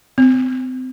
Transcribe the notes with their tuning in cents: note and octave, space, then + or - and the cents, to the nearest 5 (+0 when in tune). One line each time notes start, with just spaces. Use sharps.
C4 -35